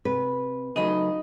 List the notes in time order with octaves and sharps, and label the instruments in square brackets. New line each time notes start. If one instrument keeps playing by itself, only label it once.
[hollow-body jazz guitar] C3 [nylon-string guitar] B4
[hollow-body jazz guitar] C#3 F#3 A3 [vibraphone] D#4 B5 [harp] D#5